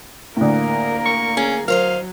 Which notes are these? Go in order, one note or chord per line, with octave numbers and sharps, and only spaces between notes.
D2 A2 A#3 A#4
C#6
C#4 G#4
F#3 A#4 C5 D#5 F5